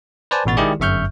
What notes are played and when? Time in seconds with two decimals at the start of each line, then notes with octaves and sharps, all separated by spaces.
0.31 B4 C5 D5 G#5 A5
0.45 A1 B2 F#4 A6
0.57 D#3 G#3 E4 G4 G#4 D5
0.80 G1 F#2 E5 C#6 F6 G6